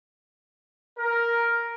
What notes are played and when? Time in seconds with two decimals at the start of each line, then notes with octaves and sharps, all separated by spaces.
0.99 A#4